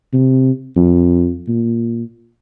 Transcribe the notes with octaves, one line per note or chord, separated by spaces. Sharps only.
C3
F2
A#2